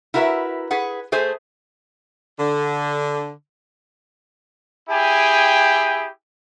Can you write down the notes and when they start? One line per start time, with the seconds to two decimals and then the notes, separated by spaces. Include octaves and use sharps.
0.14 E4 F#4 A#4 B4 E5
0.71 G#4 B4 F#5
1.12 A3 G#4 C5 G#5
2.39 D3
4.89 E4 G4 G#4 G5 G#5